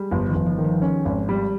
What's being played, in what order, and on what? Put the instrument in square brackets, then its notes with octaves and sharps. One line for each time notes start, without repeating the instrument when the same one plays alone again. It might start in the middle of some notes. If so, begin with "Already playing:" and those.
Already playing: [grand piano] G3 [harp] G#3
[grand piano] G1 [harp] F3
[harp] D#3
[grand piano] G1
[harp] F3
[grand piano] D#3
[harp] G3
[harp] G#3 [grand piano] C#4
[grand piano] G#1
G3